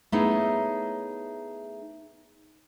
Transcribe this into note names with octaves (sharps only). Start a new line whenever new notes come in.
A3 B3 D#4 E4 G#4 C#5